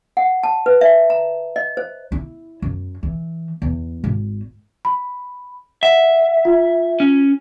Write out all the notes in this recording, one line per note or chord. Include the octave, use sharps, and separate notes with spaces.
F#5
A5
B4
E5
A#5
D#5
C5
E4
F#2
E3
E2
G#1
B5
E5 F#5
F4
C#4